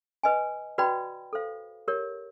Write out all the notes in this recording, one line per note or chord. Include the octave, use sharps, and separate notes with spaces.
B4 D#5 G#5
F#4 B4 D5 G5 B5
A4 C5 F5
G4 A#4 C#5